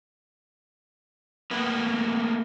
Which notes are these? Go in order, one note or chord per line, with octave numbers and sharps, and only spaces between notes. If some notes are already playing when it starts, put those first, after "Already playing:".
A3 A#3 B4